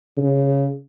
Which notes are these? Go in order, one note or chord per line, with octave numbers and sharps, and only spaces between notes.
C#3